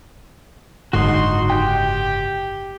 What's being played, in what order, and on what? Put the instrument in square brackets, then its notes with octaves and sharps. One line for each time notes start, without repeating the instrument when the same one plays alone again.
[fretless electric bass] F#1 G#2 D3 [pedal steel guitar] D#4 F#4 [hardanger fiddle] C6
[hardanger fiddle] G4 [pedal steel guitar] G5 G6